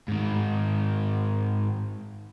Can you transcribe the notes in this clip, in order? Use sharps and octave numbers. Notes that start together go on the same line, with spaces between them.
G#2 D#3